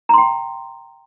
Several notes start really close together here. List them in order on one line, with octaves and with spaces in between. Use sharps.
A#5 C6 G5